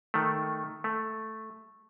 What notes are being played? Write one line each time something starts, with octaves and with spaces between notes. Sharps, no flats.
D#3 A3
A3